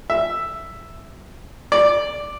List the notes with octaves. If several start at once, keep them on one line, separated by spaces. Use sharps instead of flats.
E5
D5